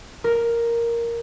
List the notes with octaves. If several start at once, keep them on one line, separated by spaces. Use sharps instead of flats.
A#4